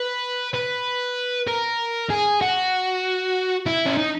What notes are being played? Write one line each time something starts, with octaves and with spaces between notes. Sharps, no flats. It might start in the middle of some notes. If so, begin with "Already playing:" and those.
Already playing: B4
B4
A#4
G#4
F#4
E4
C#4
D#4